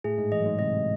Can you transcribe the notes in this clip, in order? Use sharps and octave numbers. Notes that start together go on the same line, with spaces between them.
A2 A3 G#4
G#2 G#3
E3 D#5
F#3
G#2 G#3
C3 C4 D#5